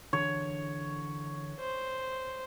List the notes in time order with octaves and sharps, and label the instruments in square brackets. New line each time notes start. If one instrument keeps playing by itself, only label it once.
[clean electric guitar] D3 E3 [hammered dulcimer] C#5
[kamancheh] C5